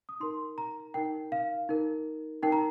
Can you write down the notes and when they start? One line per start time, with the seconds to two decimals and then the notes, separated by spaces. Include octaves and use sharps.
0.09 D#6
0.20 D#4 A#4 C6
0.58 A#5
0.94 D#4 A#4 G5
1.32 F5
1.69 D#4 A#4
2.42 D#4 A#4 G5
2.52 A#5